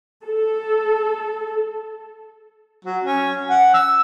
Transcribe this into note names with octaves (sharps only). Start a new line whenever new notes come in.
A4
F#3
C#4
F#5
E6